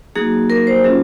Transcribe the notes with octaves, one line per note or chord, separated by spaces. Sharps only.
F#3 A#3 D#4 F#4 G#4
A#4
C5
F#3 C#4 F4 G#4